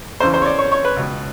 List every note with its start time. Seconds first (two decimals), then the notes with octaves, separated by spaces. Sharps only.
0.20 E2 C#3 E3 C5
0.34 C5
0.42 C#5
0.46 D5
0.59 C#5
0.72 C#5
0.85 B4
0.96 C#2 B2